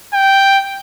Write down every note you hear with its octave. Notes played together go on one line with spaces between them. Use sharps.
G5